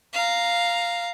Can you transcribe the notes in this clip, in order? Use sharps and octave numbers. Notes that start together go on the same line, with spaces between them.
F5 A#5